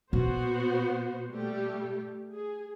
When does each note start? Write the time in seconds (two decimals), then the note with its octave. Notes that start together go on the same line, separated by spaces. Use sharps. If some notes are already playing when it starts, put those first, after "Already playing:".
0.13 A#2 B3 F#4 C5
1.32 G3 A3 G4
2.32 G#4